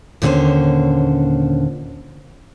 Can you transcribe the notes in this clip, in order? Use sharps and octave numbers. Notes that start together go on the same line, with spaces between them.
D#2 A#2 D3 A3 C#4 C5